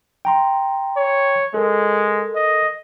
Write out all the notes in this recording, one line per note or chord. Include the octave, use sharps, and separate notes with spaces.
G5 A#5 C6
C#5
G#3 A4 A#4
D#5